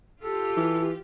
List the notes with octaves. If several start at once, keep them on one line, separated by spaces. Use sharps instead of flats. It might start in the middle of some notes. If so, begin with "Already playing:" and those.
F4 G4 A4
E3